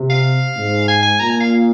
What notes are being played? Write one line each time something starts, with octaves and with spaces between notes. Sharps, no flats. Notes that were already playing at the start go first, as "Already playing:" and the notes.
Already playing: C3
F5
G#2
G#5
G#5
A#2 A#5
G#5
F5